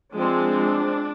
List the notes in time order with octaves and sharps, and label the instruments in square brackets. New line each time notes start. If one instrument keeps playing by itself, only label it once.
[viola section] F3 G#3 C4 D4